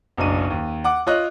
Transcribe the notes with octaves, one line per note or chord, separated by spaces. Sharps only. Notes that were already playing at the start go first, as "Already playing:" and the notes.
F#1 B1 D4 D#7
D#2
F#5 D6
F4 C#5 D#5 F#6